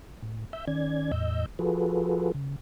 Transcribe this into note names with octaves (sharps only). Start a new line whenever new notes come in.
A2
E5 E6 G6
D#3 C#4 D5 G#6
E2 A2 D#5 E6 G6
F3 F4 F#4 G#4 A4 B4
C#3